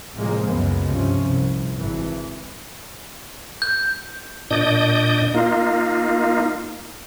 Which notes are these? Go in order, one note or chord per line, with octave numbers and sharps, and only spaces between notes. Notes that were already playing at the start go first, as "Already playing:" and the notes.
A2 C3 F3 G#3 A#3
C#2 F#2 C#3 G#3 A#3 B3
G2 C3 F3 C#4
C2
G#1 E3
G6
A#2 D4 D5 D#5 D#6 G6
A#3 D#4 F4